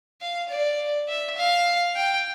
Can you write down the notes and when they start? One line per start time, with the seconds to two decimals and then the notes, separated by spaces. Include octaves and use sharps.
0.21 F5
0.50 D5
1.08 E5
1.37 F5
1.96 G5